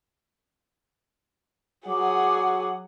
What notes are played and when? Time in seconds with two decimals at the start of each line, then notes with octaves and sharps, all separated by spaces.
1.88 F#3 G#4 F#5 D6